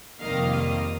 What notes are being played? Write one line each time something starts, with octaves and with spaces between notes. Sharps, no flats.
F2 C3 D#3 G3 A#3 D#5 F5
D#5 F5